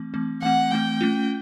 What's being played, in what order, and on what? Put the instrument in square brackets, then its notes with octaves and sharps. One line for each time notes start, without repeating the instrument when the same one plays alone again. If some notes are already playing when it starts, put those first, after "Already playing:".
Already playing: [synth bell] E3 A3 C4
E3 A3 C4
[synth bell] E3 A3 C4 [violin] F#5
[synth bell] E3 A3 C4 [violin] G5
[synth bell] A3 C#4 F4